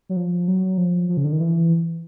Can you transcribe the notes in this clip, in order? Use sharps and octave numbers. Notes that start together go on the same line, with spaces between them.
F#3
F3
F#3
F3
F3
C#3
D3
D#3
E3